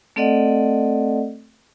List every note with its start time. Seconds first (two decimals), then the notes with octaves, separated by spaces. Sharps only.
0.16 A3 C4 A4 D5 D#5 F#5